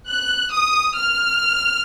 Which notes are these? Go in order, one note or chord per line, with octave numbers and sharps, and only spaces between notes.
F#6
D#6
F6